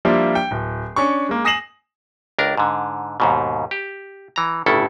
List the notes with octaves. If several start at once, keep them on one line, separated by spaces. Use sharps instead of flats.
F3 G3 A#3 D4 E4 F4
G5
D1
C#4 D4 C#6
G#3 A#3
G#5 D#6 A#6 C7 E7 F#7
C#2 D4 A#4
G#2 D3
D#2 G#2 B2
G4
E3 A#5
G1 A2 C#3 E4 A4